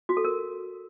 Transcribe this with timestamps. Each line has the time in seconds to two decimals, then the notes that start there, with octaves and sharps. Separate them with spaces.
0.09 F#4
0.17 A4
0.25 A#4